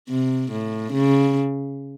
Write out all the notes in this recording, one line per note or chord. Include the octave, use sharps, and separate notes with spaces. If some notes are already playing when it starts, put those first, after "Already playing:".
C3
A2
C#3